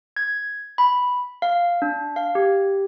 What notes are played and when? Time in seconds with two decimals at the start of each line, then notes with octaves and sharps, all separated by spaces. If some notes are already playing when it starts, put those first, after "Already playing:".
0.17 G#6
0.78 B5
1.42 F5
1.82 D4
2.16 F5
2.35 G4